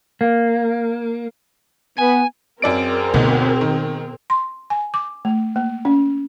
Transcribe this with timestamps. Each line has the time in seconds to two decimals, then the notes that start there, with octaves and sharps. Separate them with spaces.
0.21 A#3
1.99 B3 G#5
2.62 F#2 C4 G#4 A#4 D5 D7
3.14 G1 D2 B2 D#4
3.61 D#3
4.30 C6
4.70 G#5
4.94 D6
5.25 A3
5.56 A#3
5.85 C#4